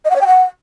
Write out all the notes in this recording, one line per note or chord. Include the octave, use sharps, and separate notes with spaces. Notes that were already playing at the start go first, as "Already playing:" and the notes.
D#5
F#5
C#5
G5
F#5